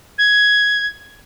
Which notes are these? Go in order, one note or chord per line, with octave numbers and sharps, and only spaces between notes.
G#6